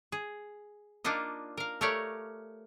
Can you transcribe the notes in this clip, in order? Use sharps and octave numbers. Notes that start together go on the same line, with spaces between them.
G#4
A#3 D4 D#4 F4 D#5
A#4 F5
A3 G4 A#4 C#5 D5 F5